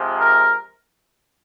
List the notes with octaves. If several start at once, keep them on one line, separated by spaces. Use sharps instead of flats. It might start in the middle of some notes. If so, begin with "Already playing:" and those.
Already playing: C3 F3 G#3
A#4